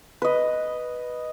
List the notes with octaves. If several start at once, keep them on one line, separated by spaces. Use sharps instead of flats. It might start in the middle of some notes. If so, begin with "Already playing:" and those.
B4 D#5